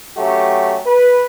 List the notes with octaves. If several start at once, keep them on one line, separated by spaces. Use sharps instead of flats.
F#3 A3 C#4 G4
B4